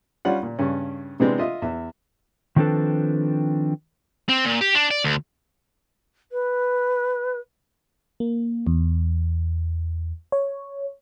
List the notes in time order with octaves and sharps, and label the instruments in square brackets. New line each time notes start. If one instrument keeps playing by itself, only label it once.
[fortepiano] G3 C#4 F4 F#5
A#2
G2 C#3 C#4
C3 E3 G#3 B3 C4 D4
F4 D#5 E5
E2 E5
[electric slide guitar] D#3 F3 C4 D4 A4 B4
[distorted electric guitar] C4
A#2
G4
D4
D5
D2
[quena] B4
[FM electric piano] A#3
E2
C#5